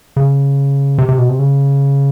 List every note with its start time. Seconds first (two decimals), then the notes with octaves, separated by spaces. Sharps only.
0.16 C#3
0.98 C3
1.09 C3
1.18 B2
1.29 C3
1.39 C#3